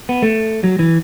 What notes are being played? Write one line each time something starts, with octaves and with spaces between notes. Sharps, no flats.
B3
A3
F#3
E3